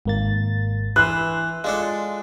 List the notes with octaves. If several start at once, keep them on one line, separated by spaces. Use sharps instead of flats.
G#1 A#3 A6
E3 B4 C6 E6 F#6
G#3 D4 F4 A4